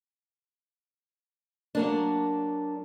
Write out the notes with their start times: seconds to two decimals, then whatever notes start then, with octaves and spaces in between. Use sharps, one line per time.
1.75 F#3 A#3 D4